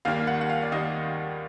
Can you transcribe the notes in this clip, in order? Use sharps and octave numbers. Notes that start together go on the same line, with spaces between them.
D#2 D#3 G3 A#3 F5
F#5
F#5
F5
D5
D#2 D#3 G3 A#3 D#5